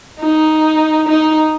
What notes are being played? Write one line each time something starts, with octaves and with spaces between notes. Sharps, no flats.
D#4
D#4